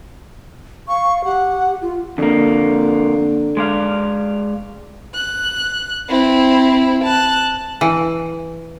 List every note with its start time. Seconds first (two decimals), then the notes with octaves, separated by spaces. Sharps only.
0.88 F5 C#6
1.25 G4 F#5
1.82 F4
2.18 F2 D3 A#3
3.57 G#3 D5 F5
5.15 F#6
6.08 C4 E4
7.03 A5 F#6
7.81 E3